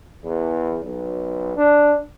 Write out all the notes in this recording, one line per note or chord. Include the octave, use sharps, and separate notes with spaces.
E2
B1
D4